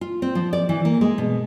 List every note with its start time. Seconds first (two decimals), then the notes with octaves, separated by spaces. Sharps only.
0.01 F4
0.22 C4
0.35 F3
0.53 D5
0.69 E3
0.85 A#3
1.01 G#3
1.18 B2